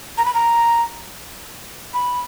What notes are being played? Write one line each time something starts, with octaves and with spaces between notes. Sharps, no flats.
A#5
B5
A#5
B5